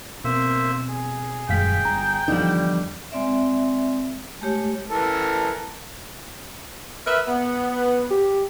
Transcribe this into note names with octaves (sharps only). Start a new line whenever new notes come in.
B2 A#3 C4 C5 E5
G#4
D#1 F#2 G#3 F5 G5 B6
G1 A#5
E2 G2 D3 F3 G3 D#4
G#3 C4 D5 E5
G#3 A3 G4 C#5
E3 A4 A#4
A#4 B4 E5
B3
G4